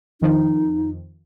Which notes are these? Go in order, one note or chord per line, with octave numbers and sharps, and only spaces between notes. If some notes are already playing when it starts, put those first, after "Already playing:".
F2 D#3 F3 D#4